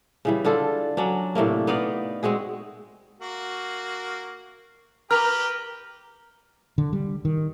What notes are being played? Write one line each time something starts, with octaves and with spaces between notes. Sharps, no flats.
C#3 E3 G3
D3 D4 F4 A4
F#3 C#4 D4
A2 C3 A3 A#3
B3 D#4 D5 F5
G#3 C4 F#4 G#4
A#3 F#4
G4 A#4 B4 G5 A#5 F6
D3
G3
D#3